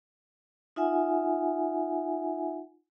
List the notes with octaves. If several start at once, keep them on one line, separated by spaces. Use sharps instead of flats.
D#4 F4 E5 F#5 G#5